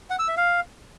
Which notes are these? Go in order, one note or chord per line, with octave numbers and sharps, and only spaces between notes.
F#5
E6
E5
F5